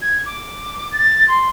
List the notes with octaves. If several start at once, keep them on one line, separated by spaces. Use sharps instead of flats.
G#6
D6
A6
C6